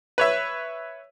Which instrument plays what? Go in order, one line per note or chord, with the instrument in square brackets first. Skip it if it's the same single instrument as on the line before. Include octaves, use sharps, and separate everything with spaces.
[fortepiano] B4 C#5 E5